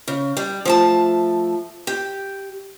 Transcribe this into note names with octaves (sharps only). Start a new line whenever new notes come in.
C#3
G3
F3 A3 A5
G4